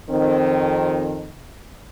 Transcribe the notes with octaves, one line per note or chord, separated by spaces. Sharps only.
F2 D#3 C4